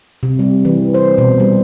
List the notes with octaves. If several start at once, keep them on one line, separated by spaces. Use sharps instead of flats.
C3
G3
E3
C5
B2
G3